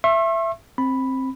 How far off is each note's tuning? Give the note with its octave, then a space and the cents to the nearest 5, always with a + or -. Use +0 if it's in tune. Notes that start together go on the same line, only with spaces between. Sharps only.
E5 +15 C#6 -45 E6 +30
C4 +15 B5 +0